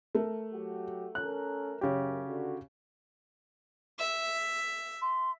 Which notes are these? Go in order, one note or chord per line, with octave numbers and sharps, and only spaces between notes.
A3 A#4
F#3 F#4 G4
C#4 A4 A#4 F#6
F#2 C#3 G4
D3 F#4
E5
C6